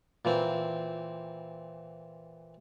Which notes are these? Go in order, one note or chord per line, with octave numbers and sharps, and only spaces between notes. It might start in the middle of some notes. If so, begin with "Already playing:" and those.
A#2 E3 C4